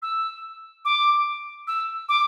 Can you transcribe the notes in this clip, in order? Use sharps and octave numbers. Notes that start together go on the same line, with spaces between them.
E6
D6
E6
D6